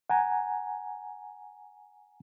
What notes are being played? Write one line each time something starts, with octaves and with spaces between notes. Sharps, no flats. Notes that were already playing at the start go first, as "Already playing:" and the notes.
F#5 G#5 A#5